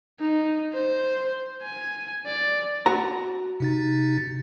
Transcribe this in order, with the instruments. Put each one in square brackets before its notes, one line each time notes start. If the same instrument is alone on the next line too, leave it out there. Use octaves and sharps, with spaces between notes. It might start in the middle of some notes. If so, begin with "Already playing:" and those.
[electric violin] D#4
C5
G#5
D5
[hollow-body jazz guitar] F#4 A#5
[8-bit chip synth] C3 D#4 A6